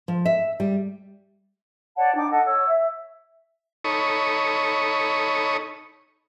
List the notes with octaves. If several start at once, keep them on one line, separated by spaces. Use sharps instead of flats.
F3
E5
G3
C#5 D5 F#5 A5
D4 D#4 G5 D6
A4 D#5 F#5 A5
C#5 E6
E5
D#4 A4 C#5 B5 C#6 D#6